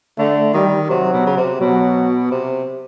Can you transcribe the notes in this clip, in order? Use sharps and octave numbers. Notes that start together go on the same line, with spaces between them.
D3 A3
D#3 G3
C3 F#3
B2
C#3
C3
B2 F#3
C3